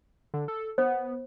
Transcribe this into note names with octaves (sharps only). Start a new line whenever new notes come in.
D3
A4
B3 C5